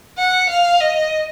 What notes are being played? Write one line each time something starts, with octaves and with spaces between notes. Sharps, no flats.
F#5
F5
D#5